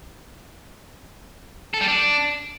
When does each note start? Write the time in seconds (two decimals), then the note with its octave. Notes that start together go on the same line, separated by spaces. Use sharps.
1.74 A4
1.81 G3
1.88 D4